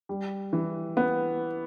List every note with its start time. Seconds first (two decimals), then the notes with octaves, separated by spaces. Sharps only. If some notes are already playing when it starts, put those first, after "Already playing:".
0.09 G3
0.53 E3
0.97 B3